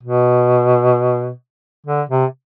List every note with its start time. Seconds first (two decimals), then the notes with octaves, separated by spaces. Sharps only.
0.03 B2
1.86 D3
2.09 C3